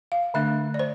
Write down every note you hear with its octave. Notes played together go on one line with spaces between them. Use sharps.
F5
D3 A3 D4 E5
D5
C5